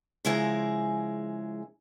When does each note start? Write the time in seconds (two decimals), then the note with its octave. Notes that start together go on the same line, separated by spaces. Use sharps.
0.25 C#3 F3 G#3 E4 G#4 A#4